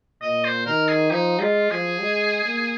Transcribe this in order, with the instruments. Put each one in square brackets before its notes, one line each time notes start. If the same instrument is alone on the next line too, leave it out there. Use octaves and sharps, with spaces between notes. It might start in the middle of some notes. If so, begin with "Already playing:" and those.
[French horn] A#2 [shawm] D#5
[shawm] C5
[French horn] D#3 [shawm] A#4
[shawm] G#4
[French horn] F3 [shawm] D#4
[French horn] G#3 [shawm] F4
[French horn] F3 [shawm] G#4
[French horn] G#3
A#3